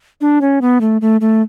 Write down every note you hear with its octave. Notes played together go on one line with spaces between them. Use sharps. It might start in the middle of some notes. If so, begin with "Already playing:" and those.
D4
C#4
B3
A3
A3
A3